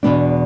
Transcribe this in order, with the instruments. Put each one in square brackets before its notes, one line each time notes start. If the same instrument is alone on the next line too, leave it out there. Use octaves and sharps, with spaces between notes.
[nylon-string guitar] E2 B2 B3 D4